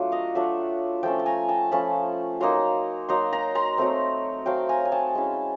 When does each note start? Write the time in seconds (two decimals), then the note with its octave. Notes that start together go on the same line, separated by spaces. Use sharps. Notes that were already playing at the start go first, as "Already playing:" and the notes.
Already playing: F#3 A3 D4 F4
0.12 D#5 F5
0.35 F#3 A3 D4 F4 E5 F#5
1.03 F3 A3 C#4 G5 A5
1.19 A5
1.26 G#5 A#5
1.49 G5 A5
1.71 F3 A3 C#4 A5 B5
2.40 F#3 A#3 D#4 A#5 C6
3.09 F#3 A#3 D#4 A#5 C6
3.33 A#5 C6
3.55 A#5 C6
3.78 F#3 A3 C4
4.46 F#3 A3 C4 F5 G5
4.69 G#5 A#5
4.85 G#5
4.92 G5 A5
5.15 G#3 C#4 E4